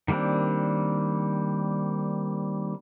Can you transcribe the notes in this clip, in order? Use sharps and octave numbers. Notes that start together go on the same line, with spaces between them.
D#3 G3 A#3 C4 D4